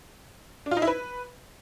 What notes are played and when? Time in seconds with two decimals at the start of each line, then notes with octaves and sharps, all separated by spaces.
0.66 D4
0.71 F4
0.77 D#4
0.82 E4
0.87 B4